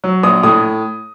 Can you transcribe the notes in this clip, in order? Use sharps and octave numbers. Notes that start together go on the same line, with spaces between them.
F#3
A#1 D#6
A2 D#6